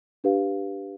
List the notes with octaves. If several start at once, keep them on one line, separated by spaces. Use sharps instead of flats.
D4 G4 B4 F5